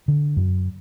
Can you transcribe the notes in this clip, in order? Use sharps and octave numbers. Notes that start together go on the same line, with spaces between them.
D3
F#2